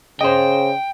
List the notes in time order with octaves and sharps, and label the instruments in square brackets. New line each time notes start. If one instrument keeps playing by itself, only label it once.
[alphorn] C#3 [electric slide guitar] C5 D#5 [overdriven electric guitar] G5